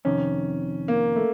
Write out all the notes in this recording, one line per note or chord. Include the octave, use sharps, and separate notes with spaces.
F2 C3 D#3 C#4
A#3
A3